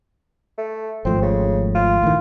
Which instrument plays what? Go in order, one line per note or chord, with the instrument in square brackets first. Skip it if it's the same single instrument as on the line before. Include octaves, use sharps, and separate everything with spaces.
[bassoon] A3
[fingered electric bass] G#1 F3 A3 [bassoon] C4
[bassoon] C#3
F4
[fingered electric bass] A2 D#3